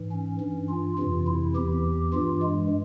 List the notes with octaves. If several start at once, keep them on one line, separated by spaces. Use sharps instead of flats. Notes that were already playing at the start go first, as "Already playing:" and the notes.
Already playing: G#2 E3
C#4
G2 E3
F4
F2 C3 E3 F4
E4
E2 E3 G4
G2 E3 F4
G#3